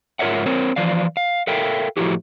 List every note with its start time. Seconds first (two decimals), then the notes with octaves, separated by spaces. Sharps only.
0.19 G#2 F4 A#4 C#5 E5 F#5
0.46 C4 A#4 C5 C#5
0.76 E3 F3 D5 F5
1.17 F5
1.47 A4 A#4 E5 F5 G5
1.97 A2 F3 A3 E4 F#4 G4